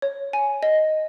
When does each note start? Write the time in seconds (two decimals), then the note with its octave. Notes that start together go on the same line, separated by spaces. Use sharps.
0.02 C#5
0.33 G#5
0.63 D#5